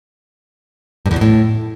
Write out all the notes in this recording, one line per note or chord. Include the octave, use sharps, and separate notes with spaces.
G2
E2
B2
A2